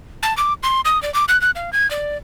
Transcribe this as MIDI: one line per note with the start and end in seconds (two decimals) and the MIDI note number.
0.23 0.36 81
0.37 0.53 86
0.63 0.81 84
0.85 1.01 87
1.02 1.13 74
1.14 1.25 86
1.28 1.40 90
1.41 1.51 90
1.55 1.72 77
1.73 1.89 92
1.91 2.17 74